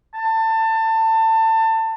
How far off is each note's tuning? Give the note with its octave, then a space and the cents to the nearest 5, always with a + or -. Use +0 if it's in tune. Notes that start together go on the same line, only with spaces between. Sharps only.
A5 +25